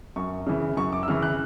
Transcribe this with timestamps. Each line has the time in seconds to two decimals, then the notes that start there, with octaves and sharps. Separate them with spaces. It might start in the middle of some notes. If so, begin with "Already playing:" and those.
0.16 F#2 C#6
0.47 C#3 E3
0.77 F#2 C#6
0.93 D6
1.03 E6
1.08 C#3 E3 F6
1.23 F#6